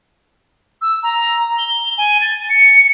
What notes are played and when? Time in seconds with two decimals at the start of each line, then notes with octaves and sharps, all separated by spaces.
0.81 E6
1.03 A#5
1.58 G7
1.97 G#5
2.21 A6
2.49 C#7